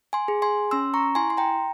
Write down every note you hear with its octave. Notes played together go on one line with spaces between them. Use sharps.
G#5 C6
G#4
G#5 C6
C#4 C6 E6
A#5 C#6
E4 G#5 C6
C6
G5 A#5